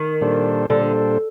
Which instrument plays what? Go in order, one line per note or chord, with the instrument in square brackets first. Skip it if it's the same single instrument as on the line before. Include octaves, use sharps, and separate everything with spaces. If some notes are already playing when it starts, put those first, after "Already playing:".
Already playing: [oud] D#3
[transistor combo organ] A#2 G3 D4 A4 C5
[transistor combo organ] A#2 G3 D4 A4 C5 [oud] D3